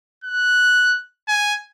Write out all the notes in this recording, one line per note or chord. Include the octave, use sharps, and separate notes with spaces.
F#6
G#5